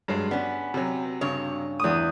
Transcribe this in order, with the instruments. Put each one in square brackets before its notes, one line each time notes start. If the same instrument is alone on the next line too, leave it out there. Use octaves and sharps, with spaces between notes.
[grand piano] G2 F#3 G#3
[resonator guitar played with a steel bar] B3 C#4 [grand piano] D4
[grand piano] C3 F#3
[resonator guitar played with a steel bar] G2 C#3 C#5
[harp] E2 D#6